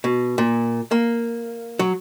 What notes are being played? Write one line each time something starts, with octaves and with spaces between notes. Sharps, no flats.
B2
A#2
A#3
F#3